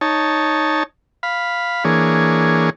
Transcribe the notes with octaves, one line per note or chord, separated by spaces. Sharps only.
D#4 C#5 A5
F5 B5
E3 A#3 D4 G#4 C#5